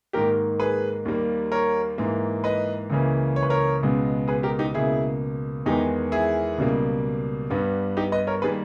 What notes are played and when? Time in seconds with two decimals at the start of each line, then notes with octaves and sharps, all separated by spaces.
0.13 G#2 D#3 A#3 G4 A#4
0.60 G#4 B4
1.05 D#2 D#3 G3 A#3
1.52 A#4 C#5
1.98 G#2 E3 A#3
2.44 B4 D#5
2.90 C#2 C#3 E3 A#3
3.36 C#5
3.43 B4
3.50 A#4 C#5
3.83 C#2 B2 G#3 B3
4.28 G#4 B4
4.43 G4 A#4
4.59 D#4 G4
4.74 C#2 B2 A#3 E4 G#4
5.66 E2 D#3 G#3 B3 D#4 G4
6.12 E4 G#4
6.58 C#2 B2 G3 A#3
7.50 G2 G3 B3
7.97 D#4 G4
8.12 B4 D#5
8.27 A#4 C#5
8.42 D#3 G3 A#3 G#4 B4